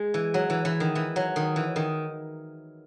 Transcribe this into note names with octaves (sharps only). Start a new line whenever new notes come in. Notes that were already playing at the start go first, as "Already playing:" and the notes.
Already playing: G#3
E3
F#3
E3
E3
D#3
E3
F#3
D#3
E3
D#3